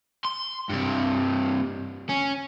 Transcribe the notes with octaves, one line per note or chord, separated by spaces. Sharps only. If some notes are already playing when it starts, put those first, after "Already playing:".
C6
G2 C3
C#4